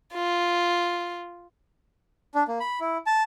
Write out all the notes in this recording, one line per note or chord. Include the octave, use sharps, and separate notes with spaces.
F4
D4
A#3
B5
E4
A5